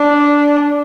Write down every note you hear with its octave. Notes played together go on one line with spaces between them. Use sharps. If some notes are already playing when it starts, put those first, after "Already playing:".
Already playing: D4